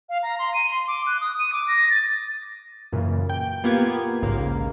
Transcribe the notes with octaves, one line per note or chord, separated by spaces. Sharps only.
F5
A#5
C6
D#7
C6
D6
F#6
D#6
D#7
D6
A#6
A6
F#2 A#2 C#3 E3
G5
A#3 B3 F4 G4 G#6
A#1 D#2 G#2 C#3 A#3